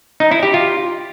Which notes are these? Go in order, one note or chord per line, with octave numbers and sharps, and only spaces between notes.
D#4
E4
G4
F4